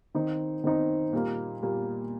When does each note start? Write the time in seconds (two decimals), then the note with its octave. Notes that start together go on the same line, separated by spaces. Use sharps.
0.14 D#3 C4 D#4
0.64 D#3 C4 D#4
1.13 A#2 G3 A#3
1.62 A#2 G3 A#3